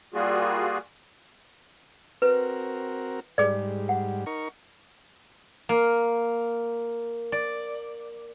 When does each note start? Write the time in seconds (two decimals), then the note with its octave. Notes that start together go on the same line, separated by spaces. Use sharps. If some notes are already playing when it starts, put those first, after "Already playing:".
0.14 G3 A#3 F4 F#4 G#4
2.22 C4 F#4 A#4 B4
3.38 G#2 G3 G#4 D5
3.89 F#5
4.26 D#4 A#4 C#6
5.69 A#3
7.32 D5